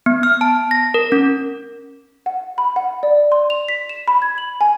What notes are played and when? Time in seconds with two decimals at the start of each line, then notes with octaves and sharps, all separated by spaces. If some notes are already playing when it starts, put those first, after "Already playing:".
0.06 B3
0.23 F6
0.41 A5
0.71 A#6
0.94 A#4
1.12 C#4
2.26 F#5
2.58 B5
2.76 F#5
3.03 D5
3.32 C6
3.50 F7
3.69 B6
3.89 E7
4.08 B5
4.22 G#6
4.38 F#7
4.61 G#5